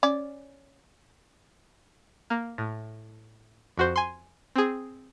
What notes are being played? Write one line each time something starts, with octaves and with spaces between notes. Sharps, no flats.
C#4 D5
A#3
A2
F2 F#4 C5
G#5 C6
C4 G#4